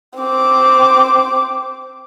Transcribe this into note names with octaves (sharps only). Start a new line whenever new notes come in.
C4 D6